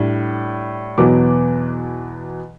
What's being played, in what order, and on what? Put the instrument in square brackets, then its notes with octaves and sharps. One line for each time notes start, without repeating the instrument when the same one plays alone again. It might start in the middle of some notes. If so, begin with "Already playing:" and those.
Already playing: [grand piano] A2 G3 D4
E2 B2 F#3 B3 D6